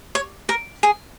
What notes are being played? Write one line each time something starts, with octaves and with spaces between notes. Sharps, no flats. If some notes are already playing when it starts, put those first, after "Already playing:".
C#5
A#4
G#4